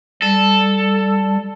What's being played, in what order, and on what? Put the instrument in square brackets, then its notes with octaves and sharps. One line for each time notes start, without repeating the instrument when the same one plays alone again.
[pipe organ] G3 [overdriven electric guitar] A4